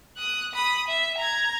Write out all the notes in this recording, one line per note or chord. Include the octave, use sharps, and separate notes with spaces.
D#6 F#6
B5 D#6
E5
A#5 G#6